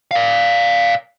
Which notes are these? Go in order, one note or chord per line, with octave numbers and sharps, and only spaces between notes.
D5 F5